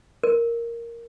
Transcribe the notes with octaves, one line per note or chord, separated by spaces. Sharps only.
A#4